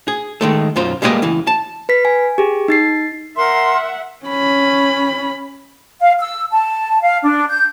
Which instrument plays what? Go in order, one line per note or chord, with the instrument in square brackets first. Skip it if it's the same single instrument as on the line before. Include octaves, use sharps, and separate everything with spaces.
[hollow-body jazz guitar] G#4
D#3 G#3 A3
B1 F#2 F4 C5
G3 G#3 A#3 E4 B4 D#5
C#2 E3
A5
[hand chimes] B4 B6
G#5
G4 G#4
D#4 A6 C7
[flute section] A#4 C6 [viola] E5 F#5
[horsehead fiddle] C#4 B5
[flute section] F5
E6
A5
F5
D4
G6